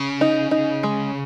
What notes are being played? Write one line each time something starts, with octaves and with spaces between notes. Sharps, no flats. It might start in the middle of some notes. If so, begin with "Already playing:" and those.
Already playing: C#3
D#4
D#4
G#3